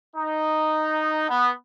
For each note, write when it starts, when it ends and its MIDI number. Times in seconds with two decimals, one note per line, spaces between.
0.15 1.25 63
1.29 1.51 59